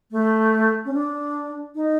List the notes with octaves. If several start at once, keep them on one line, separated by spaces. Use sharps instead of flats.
A3
C#4
D4
D#4